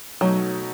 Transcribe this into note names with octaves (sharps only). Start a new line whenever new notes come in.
B2 F#3 A3 D#4